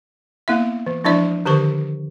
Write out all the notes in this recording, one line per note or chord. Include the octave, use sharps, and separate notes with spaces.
A#3 B3 E4 E5
E3
F3 G#3 D4 E4 D5 E5
D3 D#3 G4 B4 C5 C#6